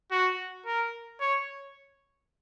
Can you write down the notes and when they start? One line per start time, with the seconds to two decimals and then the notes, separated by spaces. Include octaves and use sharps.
0.11 F#4
0.66 A#4
1.20 C#5